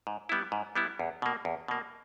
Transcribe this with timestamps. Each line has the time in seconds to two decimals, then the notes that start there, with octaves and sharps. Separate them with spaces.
0.07 G#2
0.29 G3 B3 E4
0.52 G#2
0.76 G3 B3 E4
0.99 E2
1.22 B2 A#3
1.45 E2
1.68 B2 A#3